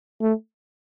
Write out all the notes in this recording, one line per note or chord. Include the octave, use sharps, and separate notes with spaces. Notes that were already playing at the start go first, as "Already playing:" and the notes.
A3